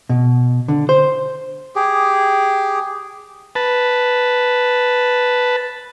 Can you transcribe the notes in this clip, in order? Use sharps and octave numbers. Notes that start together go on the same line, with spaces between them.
B2
D3
C5
G4 G#4
B4 A5